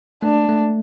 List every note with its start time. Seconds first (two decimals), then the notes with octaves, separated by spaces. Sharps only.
0.23 A3 D4
0.49 A3